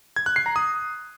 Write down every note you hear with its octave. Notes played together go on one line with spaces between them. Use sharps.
G#6
F#6
C7
A#5
D#6